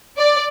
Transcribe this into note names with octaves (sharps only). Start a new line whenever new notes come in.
D5